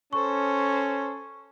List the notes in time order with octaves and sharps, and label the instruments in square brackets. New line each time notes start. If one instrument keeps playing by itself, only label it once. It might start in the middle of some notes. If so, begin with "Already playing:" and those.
[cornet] C#4 [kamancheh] A4 C5 [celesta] C#6